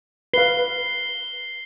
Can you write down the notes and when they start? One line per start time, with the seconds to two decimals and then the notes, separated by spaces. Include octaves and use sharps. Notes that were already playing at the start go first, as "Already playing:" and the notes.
0.33 B4 F5 C7 G7